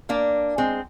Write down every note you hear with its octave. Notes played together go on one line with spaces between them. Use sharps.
A#3 D4
G#3 C4